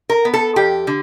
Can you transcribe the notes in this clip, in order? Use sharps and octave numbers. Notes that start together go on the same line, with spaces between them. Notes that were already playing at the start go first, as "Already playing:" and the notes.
A#4
B3
A4
F2 G4
D3